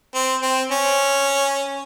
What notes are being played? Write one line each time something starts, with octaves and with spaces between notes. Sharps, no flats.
C4
C4
C#4